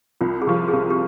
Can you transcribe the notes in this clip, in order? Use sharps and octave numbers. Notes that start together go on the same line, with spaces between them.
C2 F4
G#4
C3 F3 G4
G#4
C2 G4
G4